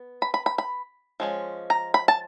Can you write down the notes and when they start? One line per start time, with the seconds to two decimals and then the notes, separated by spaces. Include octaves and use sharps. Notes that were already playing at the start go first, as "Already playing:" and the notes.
Already playing: B3
0.22 B5
0.34 B5
0.46 B5
0.58 B5
1.20 F3 G#3 C#4
1.70 A#5
1.94 B5
2.08 A5